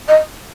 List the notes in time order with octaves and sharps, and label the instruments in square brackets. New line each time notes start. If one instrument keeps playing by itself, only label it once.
[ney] D#5